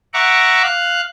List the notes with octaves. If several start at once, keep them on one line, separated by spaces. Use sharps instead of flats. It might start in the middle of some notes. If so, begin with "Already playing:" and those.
E5 F#5 A#5 C#6 D6
F5 F#6